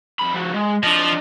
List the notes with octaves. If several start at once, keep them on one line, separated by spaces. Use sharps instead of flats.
F2 B5
F3 F#4
G#3
F3 D4 D#5